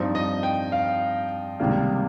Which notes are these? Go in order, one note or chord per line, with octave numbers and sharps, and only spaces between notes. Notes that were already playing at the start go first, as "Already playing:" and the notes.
Already playing: G2 F3 C4 D#4
D#5
G5
F5
C#2 C3 D#3 G3 A#3